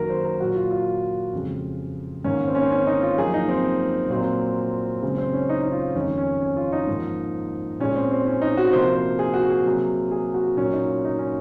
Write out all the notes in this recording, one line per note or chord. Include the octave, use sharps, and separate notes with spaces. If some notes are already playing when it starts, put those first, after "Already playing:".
Already playing: F#2 D#3 A#3 F#4 A#4
C5
A#4
A#2 F#3 A#3 F#4
F4
F4
F2 C#3 G#3
G#2 D#3 A#3 C#4
C4
C#4
C4
C#4
D#4
F4
F#2 F3 A#3 G#4
D#4
C4
A#2 F#3 A#3 C4
F#2 C#3 G#3 C4
C4
C#4
D#4
D#4
F4
F2 D#3 G#3 C#4
C#4
C#4
F4
D#4
G#2 F3 A#3
A#2 G#3 C#4
C4
C4
C#4
D#4
F#4
C3 F3 A#3 C5
C5
G#4
F#4
G#4
C3 F#3 A#3
G#4
F#4
A#2 F#3 A#3 C#4
D#4
F4
D#4
C#4